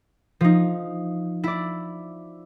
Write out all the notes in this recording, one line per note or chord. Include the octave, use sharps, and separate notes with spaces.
F3 D#4
E4 D5